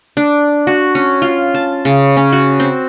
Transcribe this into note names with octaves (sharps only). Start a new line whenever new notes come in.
D4
F#4
C#4
F4
A5
C#3
C#4
F#4
C4